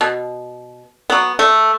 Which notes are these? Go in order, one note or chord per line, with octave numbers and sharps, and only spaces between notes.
B2
F#3 B3
A3